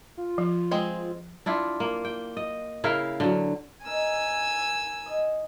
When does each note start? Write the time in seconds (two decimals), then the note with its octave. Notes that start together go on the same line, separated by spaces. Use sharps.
0.17 F4
0.38 F3
0.71 G#3 C4 G#4
1.46 D4 E4 F4
1.80 A#3
2.05 G5
2.37 D#5
2.84 C#3 E4 A#4 F5
3.20 D3 F#3
3.86 D#4 A#4 G#5 E6
5.06 D#5